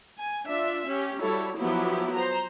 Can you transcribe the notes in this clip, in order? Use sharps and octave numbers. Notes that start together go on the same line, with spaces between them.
G#5
D4 F4 E5
C#4 G4
G3 E4 F#4 A4 C#5
F3 F#3 B3 E4 G4
C5 A#5